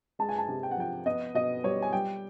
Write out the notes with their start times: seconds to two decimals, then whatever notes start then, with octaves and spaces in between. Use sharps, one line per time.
0.19 G#3 A5
0.29 G#5
0.38 A5
0.48 C3
0.63 G5
0.71 F#5
0.77 F3 G5
1.06 B3 D#5
1.35 B2 D#5
1.63 G3 C#5
1.82 G#5
1.93 G3 G5